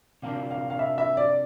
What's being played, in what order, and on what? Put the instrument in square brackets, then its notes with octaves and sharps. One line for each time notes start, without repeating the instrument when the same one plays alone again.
[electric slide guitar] C3 F3 A#3 D4 [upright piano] F5
[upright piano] F5
F5
E5
E5
D5